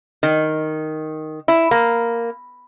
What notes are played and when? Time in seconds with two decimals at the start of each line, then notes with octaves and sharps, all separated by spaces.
0.23 D#3
1.48 E4
1.71 A#3